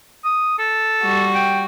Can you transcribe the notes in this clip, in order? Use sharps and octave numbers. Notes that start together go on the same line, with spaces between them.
D#6
A4
G3 F#4
G5